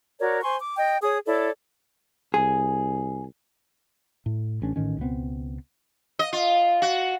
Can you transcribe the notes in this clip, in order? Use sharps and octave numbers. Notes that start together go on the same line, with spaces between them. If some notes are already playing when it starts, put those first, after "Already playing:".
F#4 A#4 C#5 D5
C5 G#5 C6 C#6
D6
D#5 G5
G#4 C#5 D#6
E4 A4 C#5 D5
C2 G#4
A2
A1 C#4 D4
A1 A2 D#3 C#4
C#2 B2 B3 C4
D#5
F4
F#4